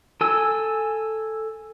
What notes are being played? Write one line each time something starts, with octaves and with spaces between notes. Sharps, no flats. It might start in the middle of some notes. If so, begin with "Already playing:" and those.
A4 G#5 E6